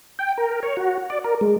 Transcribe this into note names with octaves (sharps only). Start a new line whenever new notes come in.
G5
A#4
C#5
F#4
D5
A#4
G#3